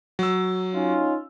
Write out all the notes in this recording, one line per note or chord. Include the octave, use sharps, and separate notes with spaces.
F#3 E6
C#4 D#4 F4